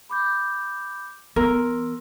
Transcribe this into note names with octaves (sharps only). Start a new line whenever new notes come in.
B5 D6 G6
E3 B3 A#4 C6 E6